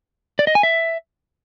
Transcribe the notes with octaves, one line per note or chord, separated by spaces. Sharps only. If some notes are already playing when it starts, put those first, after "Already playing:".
D5
D#5
G#5
E5